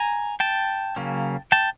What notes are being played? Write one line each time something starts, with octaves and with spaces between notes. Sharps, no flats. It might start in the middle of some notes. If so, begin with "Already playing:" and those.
Already playing: G#5 A#5
G5 A5
C#3 F#3 A#3 C#4
G5 A5